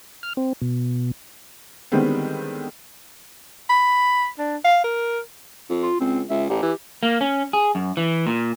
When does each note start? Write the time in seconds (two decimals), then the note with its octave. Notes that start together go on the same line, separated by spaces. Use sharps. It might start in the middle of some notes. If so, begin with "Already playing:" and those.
0.23 F6
0.37 C4
0.62 B2
1.92 D3 D#3 G3 G#3 B3 C4
3.70 B5
4.39 D4
4.65 F5
4.84 A#4
5.70 F2
5.83 F4
6.00 C#2 C4
6.30 C#2 E5
6.50 A1 G4
6.63 E3
7.03 A#3
7.21 C#4
7.53 G#4
7.75 F#2
7.97 E3
8.27 A#2